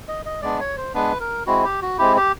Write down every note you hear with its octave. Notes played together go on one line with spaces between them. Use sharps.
D#5
D#5
G#3 B3 D4 D5
C#5
C5
G#3 B3 D4 B4
A#4
G#3 C4 E4 F#4
G4
F#4
G#3 C4 E4 G4
G4